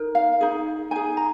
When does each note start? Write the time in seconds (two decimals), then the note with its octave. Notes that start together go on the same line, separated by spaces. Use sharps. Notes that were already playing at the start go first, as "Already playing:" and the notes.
Already playing: D#4 A#4
0.15 F5
0.41 D#4 G#4
0.91 D#4 G#4 G#5
1.17 A#5